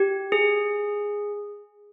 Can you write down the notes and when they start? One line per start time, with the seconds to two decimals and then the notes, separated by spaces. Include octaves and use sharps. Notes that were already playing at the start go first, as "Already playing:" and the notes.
Already playing: G4
0.32 G#4